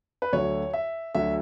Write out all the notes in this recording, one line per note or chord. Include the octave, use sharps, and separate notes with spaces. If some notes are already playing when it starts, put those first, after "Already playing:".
B4
D2 D3 F#3 C#5
E5
D2 D3 F#3 E5